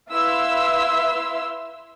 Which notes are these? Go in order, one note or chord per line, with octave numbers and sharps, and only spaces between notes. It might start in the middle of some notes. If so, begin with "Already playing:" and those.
E4 B4 E5 F5 C6 E6